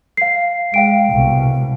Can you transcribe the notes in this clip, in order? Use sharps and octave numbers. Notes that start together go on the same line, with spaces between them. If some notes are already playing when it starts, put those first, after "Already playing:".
F5 C7
G#3 F5 G5 D7
C2 B2